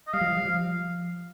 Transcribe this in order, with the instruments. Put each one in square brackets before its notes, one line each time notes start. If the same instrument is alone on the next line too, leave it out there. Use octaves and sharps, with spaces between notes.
[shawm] D#5
[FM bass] G3 [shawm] F5
[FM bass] F3
G3
F3